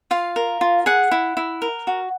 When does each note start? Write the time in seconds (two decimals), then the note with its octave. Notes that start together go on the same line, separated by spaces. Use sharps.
0.11 F4 F5
0.36 A#4
0.61 F4
0.86 G#4 F#5
1.11 E4
1.37 E4
1.62 A#4
1.87 F#4